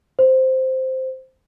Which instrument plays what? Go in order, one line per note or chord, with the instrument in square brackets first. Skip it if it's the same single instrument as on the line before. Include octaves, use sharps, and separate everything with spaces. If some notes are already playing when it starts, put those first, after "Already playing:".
[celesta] C5